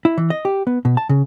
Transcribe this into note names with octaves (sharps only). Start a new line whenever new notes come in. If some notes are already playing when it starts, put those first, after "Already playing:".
E4
E3
D#5
G4
B3
B2
A5
C#3